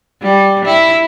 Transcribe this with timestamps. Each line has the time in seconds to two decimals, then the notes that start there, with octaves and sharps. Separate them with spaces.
0.22 G3
0.65 E4